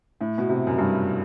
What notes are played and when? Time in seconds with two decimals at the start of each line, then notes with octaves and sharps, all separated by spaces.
0.21 A2
0.38 B2
0.49 C3
0.67 F#2
0.78 G2